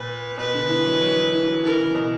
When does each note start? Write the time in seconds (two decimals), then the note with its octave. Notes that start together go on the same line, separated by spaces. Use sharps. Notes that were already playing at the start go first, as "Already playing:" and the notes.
Already playing: A#2 B4
0.38 B2 B4
0.54 D3
0.69 E3
0.85 F#3
1.01 F#3
1.16 F#3
1.33 E3
1.48 F#3
1.64 E3 A#4
1.79 C#3
1.95 B2